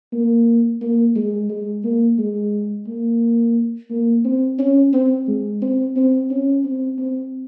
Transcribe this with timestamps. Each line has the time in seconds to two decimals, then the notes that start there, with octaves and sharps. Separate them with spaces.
0.12 A#3
0.81 A#3
1.16 G#3
1.49 G#3
1.84 A#3
2.18 G#3
2.87 A#3
3.90 A#3
4.25 C4
4.59 C#4
4.93 C4
5.28 G#3
5.62 C4
5.96 C4
6.31 C#4
6.65 C4
6.99 C4